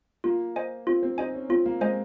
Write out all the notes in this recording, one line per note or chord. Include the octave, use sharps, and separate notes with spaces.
A#3 F4
C5 D#5 G#5
C4 F4
C4
D#4 C5 D#5 G#5
C#4
C4 F4
A#3
G#3 C5 D#5 G#5